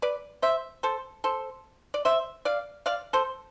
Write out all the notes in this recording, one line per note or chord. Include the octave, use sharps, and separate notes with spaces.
B4 D5
C5 E5
A4 C5
A4 C5
D5
C5 E5
D5 F5
D5 F5
A4 C5